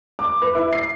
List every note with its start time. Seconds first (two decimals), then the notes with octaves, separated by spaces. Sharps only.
0.19 D6
0.42 B4
0.55 E4
0.73 C7